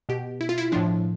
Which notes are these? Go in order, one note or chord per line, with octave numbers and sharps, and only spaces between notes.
B2 G4
E4
F4
E4
A2 F3 D4